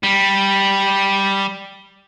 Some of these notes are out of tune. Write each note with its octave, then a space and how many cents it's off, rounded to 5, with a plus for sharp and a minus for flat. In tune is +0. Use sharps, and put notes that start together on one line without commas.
G3 +0